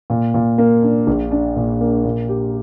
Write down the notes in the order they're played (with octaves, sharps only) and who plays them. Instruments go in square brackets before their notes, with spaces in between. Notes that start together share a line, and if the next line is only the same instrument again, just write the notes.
[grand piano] A#2
A#2
A#3
D4
A#1
D4
A#2
A#3
A#2
G4